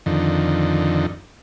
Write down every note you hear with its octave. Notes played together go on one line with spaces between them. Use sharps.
F2 D3 D#3